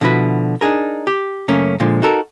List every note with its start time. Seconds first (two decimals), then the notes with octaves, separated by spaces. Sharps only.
0.01 B2 D3 F3 E4 F#4 B4
0.61 D4 D#4 G#4 A#4
1.07 G4
1.48 F#2 C#3 A3 A#3 C#4
1.80 A#2 D3 F3 G#3
2.02 D#4 F#4 A4 A#4